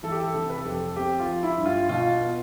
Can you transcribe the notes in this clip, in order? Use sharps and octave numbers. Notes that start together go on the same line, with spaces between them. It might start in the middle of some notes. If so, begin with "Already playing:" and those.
E3 A4
G4
A4
C3
B4
A4
F2 G4
A4
C4 G4
F4
F3
E4
G2
F4
B2 F4
B3